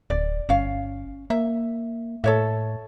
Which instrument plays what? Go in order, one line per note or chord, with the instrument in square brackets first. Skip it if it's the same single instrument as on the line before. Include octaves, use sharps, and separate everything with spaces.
[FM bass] D1 [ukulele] D5
[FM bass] G1 [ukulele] C#4 F5
[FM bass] A#3 [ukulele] E5
[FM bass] A2 [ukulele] A4 C#5 E5